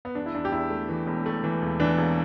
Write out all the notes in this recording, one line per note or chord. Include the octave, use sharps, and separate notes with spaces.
B3
E2 D4
E4
E2 D4
G4
E2 E4
A3
E3
E1
A3
E3
E1
E3 D4
E1